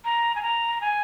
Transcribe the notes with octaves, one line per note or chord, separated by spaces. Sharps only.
A#5
G#5
A#5
G#5